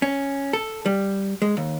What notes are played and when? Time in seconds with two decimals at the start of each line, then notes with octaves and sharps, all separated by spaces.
0.02 C#4
0.53 A4
0.85 G3
1.42 G#3
1.57 D#2